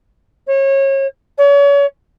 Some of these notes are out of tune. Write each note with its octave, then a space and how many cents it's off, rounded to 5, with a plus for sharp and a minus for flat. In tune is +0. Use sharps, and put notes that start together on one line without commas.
C#5 -30
C#5 +35